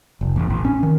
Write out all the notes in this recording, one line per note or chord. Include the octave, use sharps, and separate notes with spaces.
F1
A1
A1
C#4
D#3